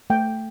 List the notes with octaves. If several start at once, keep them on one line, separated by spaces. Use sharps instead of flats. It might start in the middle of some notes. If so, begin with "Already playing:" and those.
A3 G5